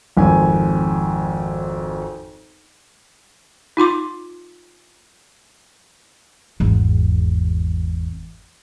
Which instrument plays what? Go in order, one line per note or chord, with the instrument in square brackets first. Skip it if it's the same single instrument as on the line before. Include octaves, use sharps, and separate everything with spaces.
[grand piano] G#1 F2 G#5
[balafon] D#4 F4 C6 D6
[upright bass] G#1 E2